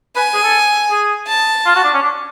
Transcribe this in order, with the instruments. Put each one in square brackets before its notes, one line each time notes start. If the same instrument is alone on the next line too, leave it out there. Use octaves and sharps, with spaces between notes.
[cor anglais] B4 [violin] G#5
[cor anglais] G#4
A4
G#4
[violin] A5
[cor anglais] F4
F#4
D4
C#4
D4